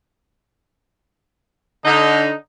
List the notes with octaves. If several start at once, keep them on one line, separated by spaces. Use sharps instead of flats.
D3 D#4